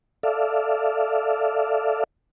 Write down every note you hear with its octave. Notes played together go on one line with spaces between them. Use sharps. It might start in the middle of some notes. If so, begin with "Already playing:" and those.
A4 D5 E5 F5